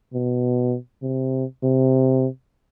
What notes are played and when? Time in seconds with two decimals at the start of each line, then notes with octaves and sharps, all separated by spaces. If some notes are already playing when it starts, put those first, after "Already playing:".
0.13 B2
1.02 C3
1.63 C3